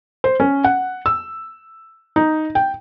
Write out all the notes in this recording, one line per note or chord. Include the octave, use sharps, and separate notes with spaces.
C5
C#4
F#5
E6
D#4
G5